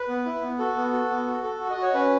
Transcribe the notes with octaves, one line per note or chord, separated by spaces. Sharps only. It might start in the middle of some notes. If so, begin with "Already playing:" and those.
Already playing: B4
B3
E4
B3
F#4 A4
B3
F#4
B3
F#4
A4
F#4
D#5
F#4
C#5
C#4 B4